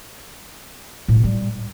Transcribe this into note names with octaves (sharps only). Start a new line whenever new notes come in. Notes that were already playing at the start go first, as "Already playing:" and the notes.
A2
C3
G3